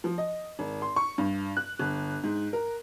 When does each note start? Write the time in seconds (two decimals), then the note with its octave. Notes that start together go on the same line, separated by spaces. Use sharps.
0.04 F3
0.18 D#5
0.59 G#1
0.82 C6
0.96 C#6
1.18 G2
1.57 F#6
1.79 G1
2.23 G#2
2.53 A#4